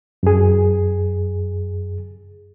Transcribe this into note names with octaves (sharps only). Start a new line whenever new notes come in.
F#2 G#4